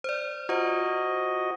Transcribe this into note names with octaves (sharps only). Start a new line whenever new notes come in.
C5 D5
F4 F#4 C5 D#5